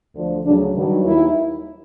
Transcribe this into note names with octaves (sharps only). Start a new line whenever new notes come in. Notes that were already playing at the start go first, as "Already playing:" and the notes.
D2 D3 F3
D2 C#3 F#3 D4
G2 D#3 F#3
D#2 D#3 E4